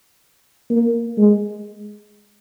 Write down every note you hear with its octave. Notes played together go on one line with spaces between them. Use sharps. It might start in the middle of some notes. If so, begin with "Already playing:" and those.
A#3
G#3